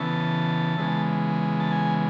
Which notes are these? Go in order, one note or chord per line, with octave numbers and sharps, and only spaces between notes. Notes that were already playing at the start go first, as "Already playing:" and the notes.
Already playing: C#3 E3 B3 A5
C#3 E3 G#3 B3
A5
G#5